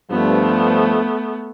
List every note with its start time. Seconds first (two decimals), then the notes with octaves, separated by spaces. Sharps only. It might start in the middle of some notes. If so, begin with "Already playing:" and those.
0.11 G2 F3 A3 B3